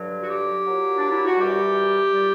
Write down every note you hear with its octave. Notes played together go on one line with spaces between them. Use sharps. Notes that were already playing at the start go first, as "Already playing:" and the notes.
Already playing: G2 D3 F#3
F#4
G4
A#2 F#3
D4
E4
F#4
F#2 E3 G3 G4
A#2 G3